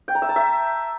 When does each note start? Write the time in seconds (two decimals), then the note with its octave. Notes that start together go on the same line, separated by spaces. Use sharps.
0.08 G5
0.15 A#5
0.22 E5
0.29 A5
0.36 E5